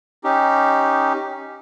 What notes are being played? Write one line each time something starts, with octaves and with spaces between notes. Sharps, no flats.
C#4 D#4 G4